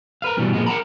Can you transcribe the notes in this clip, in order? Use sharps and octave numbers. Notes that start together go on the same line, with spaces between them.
A#4 B4 F5
G2 B2 E3 G3
A#2 F3 G#3 B3
A#4 F#5 G5 A#5 B5